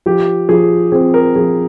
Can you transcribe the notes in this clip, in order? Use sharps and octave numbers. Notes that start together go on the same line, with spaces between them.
F3 G4
F3 G#4
C4 G#4
A#4
F3 G#4